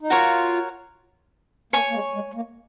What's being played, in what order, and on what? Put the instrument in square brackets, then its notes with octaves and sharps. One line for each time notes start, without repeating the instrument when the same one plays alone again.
[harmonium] D#4
[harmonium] F4 [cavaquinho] F#4 A#4 C#5
[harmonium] A#3 [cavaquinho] C#5 G#5 C#6
[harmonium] A#3
G#3
G#3
A#3